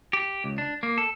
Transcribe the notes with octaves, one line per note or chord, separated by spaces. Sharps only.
G4
C#2
D4
A#3
A4